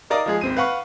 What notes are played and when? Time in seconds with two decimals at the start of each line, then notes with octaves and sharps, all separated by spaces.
0.10 D#4 A#4 D5 F5 A#5 D#6
0.26 F3 G#3 G#4
0.41 G#1 C4 D#7
0.57 B4 F5 F#5 C#6